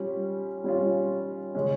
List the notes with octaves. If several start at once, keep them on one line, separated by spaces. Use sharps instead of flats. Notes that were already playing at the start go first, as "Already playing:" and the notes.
Already playing: G3 C#4 F4
G3 C#4 F4
C#3 G#3 C#4